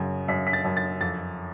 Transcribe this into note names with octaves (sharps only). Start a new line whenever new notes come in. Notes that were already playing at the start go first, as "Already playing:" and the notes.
Already playing: F#2 C#3
F#2 B6
B6
A6
F#2
A6
F2 A6